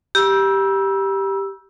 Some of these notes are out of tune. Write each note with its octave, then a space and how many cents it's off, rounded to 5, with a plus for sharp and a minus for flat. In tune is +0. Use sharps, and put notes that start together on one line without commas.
G4 +0 B5 -45 E6 +0